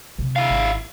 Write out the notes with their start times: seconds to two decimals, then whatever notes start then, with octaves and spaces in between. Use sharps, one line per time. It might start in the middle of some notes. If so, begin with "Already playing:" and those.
0.18 C3
0.36 E4 F5
0.50 G#1